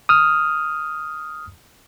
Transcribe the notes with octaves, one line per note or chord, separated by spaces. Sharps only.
D#6 F6